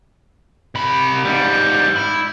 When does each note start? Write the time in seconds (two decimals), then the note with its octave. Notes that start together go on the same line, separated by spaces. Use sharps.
0.75 C3 B5
1.25 G#2 G3
1.96 E4